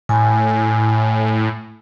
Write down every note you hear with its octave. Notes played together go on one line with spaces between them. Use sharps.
A2 G#5